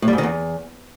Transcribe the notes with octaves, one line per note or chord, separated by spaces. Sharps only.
A2
G3
G#2
D#3
E2